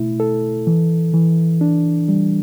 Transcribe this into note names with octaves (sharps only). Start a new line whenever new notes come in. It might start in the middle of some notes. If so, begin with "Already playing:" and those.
Already playing: B2 A3 E4
A4
E3
E3
D4
G3